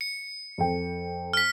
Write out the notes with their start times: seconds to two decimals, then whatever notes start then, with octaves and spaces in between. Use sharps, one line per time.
0.01 C#7
0.58 F2 A4 G5
1.33 F6 B6